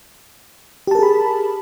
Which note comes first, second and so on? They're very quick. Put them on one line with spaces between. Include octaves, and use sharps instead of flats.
G4 A5 A#4 G#4 B5